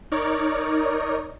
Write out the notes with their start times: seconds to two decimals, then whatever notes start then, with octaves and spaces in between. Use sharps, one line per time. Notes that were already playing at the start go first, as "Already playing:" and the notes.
0.11 D#4 A#4 C#5 D5